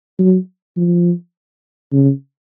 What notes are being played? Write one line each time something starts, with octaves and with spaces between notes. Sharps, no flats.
F#3
F3
C#3